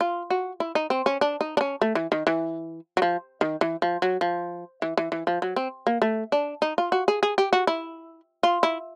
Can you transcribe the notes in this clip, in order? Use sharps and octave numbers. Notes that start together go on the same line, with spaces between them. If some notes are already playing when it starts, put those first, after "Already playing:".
F4
F#4
E4
D#4
C4
C#4
D4
D#4
D4
C#4
A3
E3
D#3
E3
F#3
F3
D#3
E3
F3
F#3
F3
E3
E3
E3
F3
F#3
C4
A#3
A3
D4
D#4
F4
F#4
G#4
G#4
G4
F#4
E4
F4
E4